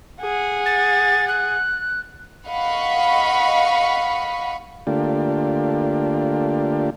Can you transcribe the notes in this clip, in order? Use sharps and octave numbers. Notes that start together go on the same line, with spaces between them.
G#4 F#5
A6
F#6
D#5 F5 F#5 B5 C#6
D3 A3 A#3 D4 F4 G4